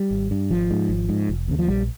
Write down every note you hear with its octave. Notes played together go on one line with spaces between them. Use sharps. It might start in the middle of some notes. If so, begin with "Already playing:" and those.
Already playing: G3
G#1
G2
G#1 F3
G#2
G#1
G#2
F1
D#2 C#3
F3
A#1 G3